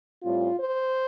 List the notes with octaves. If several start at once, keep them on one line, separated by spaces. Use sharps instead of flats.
A2 G3 C4 F4
C5